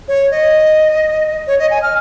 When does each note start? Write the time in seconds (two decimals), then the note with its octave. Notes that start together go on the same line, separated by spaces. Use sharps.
0.08 C#5
0.31 D#5
1.47 C#5
1.59 D#5
1.71 G#5
1.83 F6